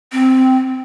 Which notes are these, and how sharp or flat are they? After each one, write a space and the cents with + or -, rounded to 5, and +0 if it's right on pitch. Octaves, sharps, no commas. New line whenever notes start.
C4 -10